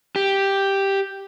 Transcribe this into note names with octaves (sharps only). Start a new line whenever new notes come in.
G4